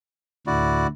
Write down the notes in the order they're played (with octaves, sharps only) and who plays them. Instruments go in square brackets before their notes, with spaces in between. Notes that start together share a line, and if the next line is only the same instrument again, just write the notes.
[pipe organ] D2 A2 D3 [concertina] E4 F#4 D5